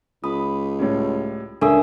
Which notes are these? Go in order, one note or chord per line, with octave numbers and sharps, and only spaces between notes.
C#2 B5 D#6
A2 G3 C#4
C#2 C#4 D4 A4 A#4 E5 D#6